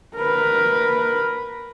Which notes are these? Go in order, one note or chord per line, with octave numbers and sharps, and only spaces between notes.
A#4 B4